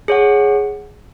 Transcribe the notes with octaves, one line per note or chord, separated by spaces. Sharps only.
G#4 C#5 F#5